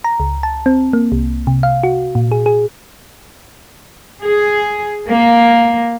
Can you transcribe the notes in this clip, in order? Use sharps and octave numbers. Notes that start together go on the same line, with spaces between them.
A#5
C#2
A5
C4
A#3
C2
C3
F5
F#4
A#2
G#4
G#4
G#4
A#3